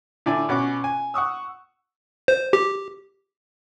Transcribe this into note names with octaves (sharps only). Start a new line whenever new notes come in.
A2 D3 D5 G#5
B2 C#4 F#5 D6
G#5
F#5 C#6 D#6 E6
C5
G4